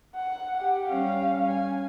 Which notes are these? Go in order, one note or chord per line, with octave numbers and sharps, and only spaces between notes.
F#5
G4 F#5
G3 C#4 F5
G#5